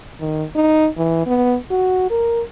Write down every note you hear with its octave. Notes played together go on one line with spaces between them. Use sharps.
D#3
D#4
E3
B3
F#4
A#4